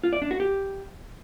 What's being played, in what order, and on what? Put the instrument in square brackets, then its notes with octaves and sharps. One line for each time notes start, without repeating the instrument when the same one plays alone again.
[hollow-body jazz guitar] F4
D5
D4
F#4
G4